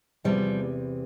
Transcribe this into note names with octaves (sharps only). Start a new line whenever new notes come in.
E2 C3 E3 F3 G3